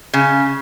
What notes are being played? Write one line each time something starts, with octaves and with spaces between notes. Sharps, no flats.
C#3